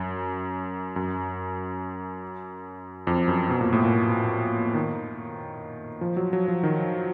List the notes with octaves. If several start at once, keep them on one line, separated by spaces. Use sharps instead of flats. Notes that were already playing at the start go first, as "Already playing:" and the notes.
Already playing: F#2
F#2
F2
F#2
B2
A#2
A2
A#2
D#3
F3
F#3
F#3
F3
D#3